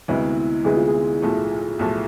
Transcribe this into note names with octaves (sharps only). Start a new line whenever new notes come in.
D2 C3 G#3 B3 E4
D2 C3 G#3 B3 G#4
F4
G#4
B1 A2 F3 A3
B1 A2 F3 A3